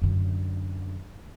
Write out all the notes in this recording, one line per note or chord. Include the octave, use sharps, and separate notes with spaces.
F#2 D3